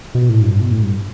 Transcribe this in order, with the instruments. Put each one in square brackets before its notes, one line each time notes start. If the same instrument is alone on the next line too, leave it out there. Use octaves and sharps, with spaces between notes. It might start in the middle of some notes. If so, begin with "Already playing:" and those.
[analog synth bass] B2
A2
G2
B2
A2
G2